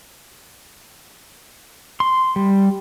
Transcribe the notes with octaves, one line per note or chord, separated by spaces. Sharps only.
C6
G3